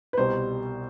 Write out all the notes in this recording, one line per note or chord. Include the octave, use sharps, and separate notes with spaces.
B4
C2 B2 G3 C5